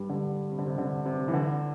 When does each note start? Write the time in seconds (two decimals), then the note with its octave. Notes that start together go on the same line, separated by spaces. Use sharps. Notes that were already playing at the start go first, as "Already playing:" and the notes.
Already playing: G2 G3
0.09 D3
0.50 C3
0.59 D3
0.66 C3
0.78 D3
1.06 C3
1.28 E3
1.33 D3